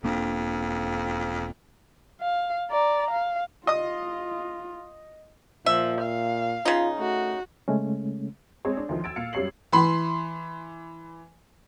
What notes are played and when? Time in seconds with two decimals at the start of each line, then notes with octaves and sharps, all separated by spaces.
0.04 E1 F2 A#3 D4
2.21 F5
2.71 D5 A#5
3.11 F5
3.67 F4 D#5 D#6
5.66 A#2 F3 E5
6.01 F5
6.65 C#3 D#4 F4
6.99 A3 F#4
7.68 C#3 G#3 A3 C#4
8.65 G#3 C4 G#4 C#5
8.77 D4
8.89 D2 D#3 F3
9.04 E6 G#6 A6 D7
9.16 A#2 F5 C#7
9.33 F#2 G3 G4 C#5 C7 F#7
9.72 E3 B5 C6